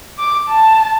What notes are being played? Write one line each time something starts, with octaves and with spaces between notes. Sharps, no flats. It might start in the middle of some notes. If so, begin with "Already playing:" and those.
D6
A5